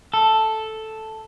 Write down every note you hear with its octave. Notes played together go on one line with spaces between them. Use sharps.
A4